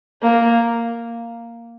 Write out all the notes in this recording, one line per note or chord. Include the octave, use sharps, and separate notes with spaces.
A#3